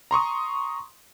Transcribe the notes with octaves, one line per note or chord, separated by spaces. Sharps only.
A#5 C6 C#6 D#6